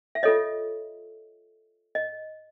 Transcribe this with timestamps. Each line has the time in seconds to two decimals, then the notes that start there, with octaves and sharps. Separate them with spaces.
0.15 E5
0.23 F4 A4 C#5 D#5
1.95 D#5